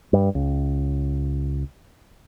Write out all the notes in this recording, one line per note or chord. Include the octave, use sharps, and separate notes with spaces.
G2
C#2